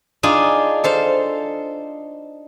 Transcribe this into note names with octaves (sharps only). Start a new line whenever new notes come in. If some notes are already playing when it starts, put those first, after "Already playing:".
D4 D#4 F4 G#4 G#5
A4 C5 F5